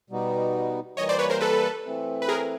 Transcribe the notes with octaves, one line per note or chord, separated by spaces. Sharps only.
B2 G3 B3 D#4 F#4
E3 G3 A#3 C#5 D#5
C5 D5
B4 C#5
A#4 C5
A4 B4
E3 A3 C4
B4
G#4 A#4